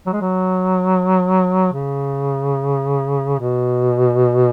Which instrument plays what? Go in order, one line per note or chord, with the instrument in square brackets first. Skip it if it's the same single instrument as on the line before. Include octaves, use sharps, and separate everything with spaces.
[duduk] F#3
G#3
F#3
C#3
B2